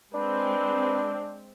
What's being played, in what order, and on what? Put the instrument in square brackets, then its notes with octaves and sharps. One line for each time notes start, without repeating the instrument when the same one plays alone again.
[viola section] G#3 C4 [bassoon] D4 [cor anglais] B4